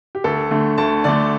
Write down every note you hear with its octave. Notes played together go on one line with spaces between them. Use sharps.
G4
D2 A4
D3 A3
D2 A5
D3 A3 D5